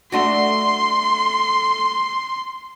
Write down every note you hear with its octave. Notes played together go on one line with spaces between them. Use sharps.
A3 D4 F#4 C6